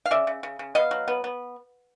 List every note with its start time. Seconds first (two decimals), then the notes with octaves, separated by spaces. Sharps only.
0.06 F5
0.11 C#3 D5 E5
0.27 C#3
0.43 C#3
0.59 C#3
0.75 B3 D#5 F5
0.91 F#3
1.08 B3
1.24 B3